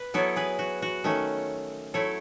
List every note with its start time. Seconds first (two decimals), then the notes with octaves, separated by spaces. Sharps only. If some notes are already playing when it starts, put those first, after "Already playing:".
Already playing: B4
0.14 F#3 B3 E4 A4 C#5
0.36 G#4 B4
0.59 F#4
0.82 F#4
1.04 D#3 A3 C#4
1.94 F#3 A3 E4 A4 C#5